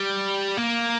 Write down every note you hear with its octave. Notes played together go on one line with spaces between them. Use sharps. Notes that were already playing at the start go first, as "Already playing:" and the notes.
Already playing: G3
A#3